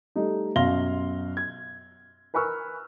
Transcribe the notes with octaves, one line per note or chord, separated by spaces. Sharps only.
G3 A3 D#4
F#2 B2 F5 C6 A#6 G7
G#6
A#4 B4 G#5 C#6 E6 F6